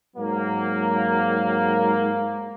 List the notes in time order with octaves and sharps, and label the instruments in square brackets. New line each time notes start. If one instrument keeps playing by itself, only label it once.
[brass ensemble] G#2 F#3 A#3